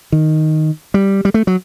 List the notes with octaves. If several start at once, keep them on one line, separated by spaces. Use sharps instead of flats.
D#3
G3
G3
A3
F#3